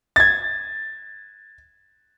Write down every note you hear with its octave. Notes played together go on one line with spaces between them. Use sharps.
G#6 A6